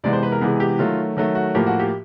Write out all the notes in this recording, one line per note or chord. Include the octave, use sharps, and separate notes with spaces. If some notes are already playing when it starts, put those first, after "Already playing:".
C3 E3 G#3 B3 D5
C5
B4
A#4
C3 E3 G#3 B3 G#4
G4
D#3 F#3 A3 F4
D#3 F#3 A3
F#4
A2 F3 A#3 G4
F#4
G4